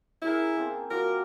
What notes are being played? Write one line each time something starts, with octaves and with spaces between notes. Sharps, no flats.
C#4 E4 G#4 A#4
A#3 C4 A5
F#3 F4 A#4 D6